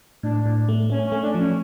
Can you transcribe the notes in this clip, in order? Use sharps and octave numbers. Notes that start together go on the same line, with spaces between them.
A2 D4
A2
A3
A3 C#4
C#4
A3
D4
F3 C#4